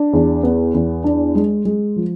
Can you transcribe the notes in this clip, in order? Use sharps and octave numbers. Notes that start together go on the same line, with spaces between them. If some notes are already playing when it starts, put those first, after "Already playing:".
Already playing: D4
E2
B3
E2
D4
G#3
G#3
F3